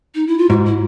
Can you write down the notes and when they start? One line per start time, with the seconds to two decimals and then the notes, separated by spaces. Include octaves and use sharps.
0.15 D#4
0.27 E4
0.38 F4
0.49 G#2 F#4
0.66 E4